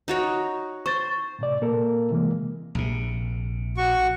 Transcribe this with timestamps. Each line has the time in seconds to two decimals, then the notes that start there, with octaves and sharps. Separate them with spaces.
0.08 D#4 F#4 C#5
0.86 C5 C#6 A6
1.39 A2 C3 D5
1.61 A#2 A#3 A4 A#4
2.11 C3 E3 G#3 A#3
2.75 A#1 C3
3.77 F#4 C#6